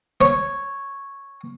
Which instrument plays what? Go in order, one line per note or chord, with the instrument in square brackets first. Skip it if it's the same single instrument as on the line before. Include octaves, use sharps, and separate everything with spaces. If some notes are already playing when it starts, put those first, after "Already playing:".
[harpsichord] C#5